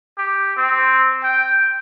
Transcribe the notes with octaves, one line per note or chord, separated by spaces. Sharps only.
G4
C4
G5